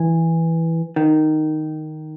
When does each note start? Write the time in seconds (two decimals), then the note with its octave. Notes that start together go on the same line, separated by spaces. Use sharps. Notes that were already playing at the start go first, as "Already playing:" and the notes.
Already playing: E3
0.96 D#3